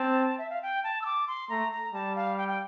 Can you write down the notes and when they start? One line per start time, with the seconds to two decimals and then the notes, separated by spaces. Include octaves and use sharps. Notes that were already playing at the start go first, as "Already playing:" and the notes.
Already playing: C4 A5
0.38 E5
0.50 F5
0.62 G5
0.84 A5
1.01 E6
1.06 D6
1.28 C6
1.49 A3 A#5
1.72 A#5
1.94 G3 A5
2.16 F5
2.38 G5
2.48 G5